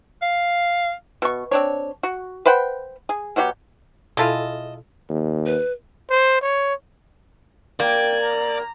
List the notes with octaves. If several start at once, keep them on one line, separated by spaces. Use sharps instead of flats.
F5
B2 C#6
C4 D4 C#5
F#4
B4 C5 F#5 G5
G#4
B2 F#3 F#4 G4
B2 G#3 E4 F4 A4 D#5 A5
D#2
B4
C5
C#5
A#3 D5 G5 G#6
A#5